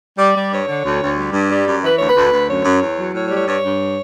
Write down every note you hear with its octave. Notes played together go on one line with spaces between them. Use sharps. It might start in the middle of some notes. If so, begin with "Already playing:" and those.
G3 D5
G3
G2 C#5
D3
D2
D2
G3
G2
G3
F#2
E3 B4
D2 C#5
B4
D2
D2
F#2 C#5
F#2
E2
F#3
A2 C#5
C#5
G3
C#5
G2 C#5
G2